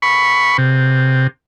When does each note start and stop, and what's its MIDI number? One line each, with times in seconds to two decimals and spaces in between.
0.02 0.57 83
0.02 0.57 85
0.58 1.27 48